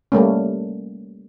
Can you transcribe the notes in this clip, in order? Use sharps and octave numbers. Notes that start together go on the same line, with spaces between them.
G3 A3 A#3 C#4